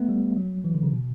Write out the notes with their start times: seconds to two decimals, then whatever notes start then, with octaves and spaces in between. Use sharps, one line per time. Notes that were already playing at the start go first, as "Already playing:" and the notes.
Already playing: A3 B3
0.09 G3
0.37 F#3
0.64 E3
0.74 D3
0.83 C#3
0.92 B2